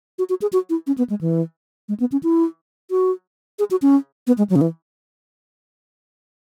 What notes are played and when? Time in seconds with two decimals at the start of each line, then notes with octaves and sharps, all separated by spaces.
0.19 F#4
0.29 F#4
0.42 G#4
0.53 F#4
0.70 E4
0.87 C#4
0.98 B3
1.10 G#3
1.21 E3
1.89 G#3
2.00 B3
2.12 C#4
2.23 E4
2.91 F#4
3.59 G#4
3.71 F#4
3.82 C#4
4.27 B3
4.38 G#3
4.50 F#3
4.56 C#3
4.61 E3